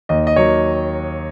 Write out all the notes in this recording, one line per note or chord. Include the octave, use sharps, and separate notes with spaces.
D#2 D#5
D#5
D#3 F#3 C#5